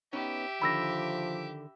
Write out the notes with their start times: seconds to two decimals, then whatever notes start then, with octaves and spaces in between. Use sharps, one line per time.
0.13 B3 C#4 D#4 G4 E5
0.62 D3 D#3 F3 B5 E6 A#6